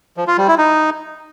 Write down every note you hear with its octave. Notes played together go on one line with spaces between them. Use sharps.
F3
F4
G3
E4
D#4